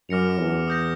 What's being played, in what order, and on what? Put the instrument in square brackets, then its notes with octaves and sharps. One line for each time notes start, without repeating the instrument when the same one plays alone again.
[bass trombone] F#2 [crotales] D6 F6 A#6 C#7 F7
[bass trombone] E2
[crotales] D#6 G6 A#6